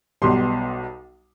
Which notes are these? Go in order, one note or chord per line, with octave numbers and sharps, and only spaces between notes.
B1 B2 G3 C6